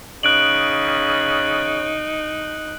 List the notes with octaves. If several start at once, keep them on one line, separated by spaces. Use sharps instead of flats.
C#3 D#4 F#6 D7 F#7